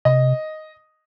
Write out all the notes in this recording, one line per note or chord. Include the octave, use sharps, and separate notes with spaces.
C3 D#5